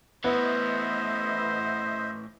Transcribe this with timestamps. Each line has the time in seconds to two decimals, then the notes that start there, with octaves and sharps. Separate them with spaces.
0.24 A2 E3 B3 C5 D#5 E5